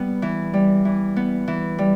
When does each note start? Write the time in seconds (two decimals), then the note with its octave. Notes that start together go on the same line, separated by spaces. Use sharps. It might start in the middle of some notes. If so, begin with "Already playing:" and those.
Already playing: G3 B3
0.22 E3
0.53 G3
0.85 E3
1.16 B3
1.48 E3
1.78 G3